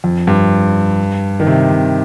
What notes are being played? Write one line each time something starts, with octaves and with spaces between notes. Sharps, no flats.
F2
G2
D#3
C3
C3